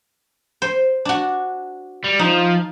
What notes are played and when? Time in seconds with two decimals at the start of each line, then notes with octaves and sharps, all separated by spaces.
0.62 C5
1.05 D4 F#4
2.04 G3
2.19 F3 D#4